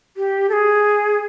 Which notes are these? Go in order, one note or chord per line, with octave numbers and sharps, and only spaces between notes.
G4
A4
G#4